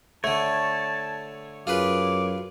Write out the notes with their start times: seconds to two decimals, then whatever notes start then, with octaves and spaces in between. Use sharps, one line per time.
0.24 D3 A3 C#5 A5
1.67 F#2 F4 G#4 B4 D6